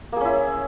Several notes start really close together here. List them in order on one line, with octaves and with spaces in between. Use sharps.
A#3 G#4 C#4 E4